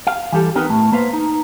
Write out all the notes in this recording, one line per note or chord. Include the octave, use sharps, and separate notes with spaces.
F5
E3 G3 G4 A4
B3 C4 D#4 A#4 B4
A2 A3
A#3 B3 B4 C5 F5
D#4